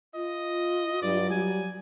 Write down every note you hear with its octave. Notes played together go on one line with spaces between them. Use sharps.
F4 D#5
G2 F#3 D5
G3 G#5